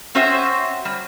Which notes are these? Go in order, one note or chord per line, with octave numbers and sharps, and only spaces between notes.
C4 C#4 F#4 C5 E5
G3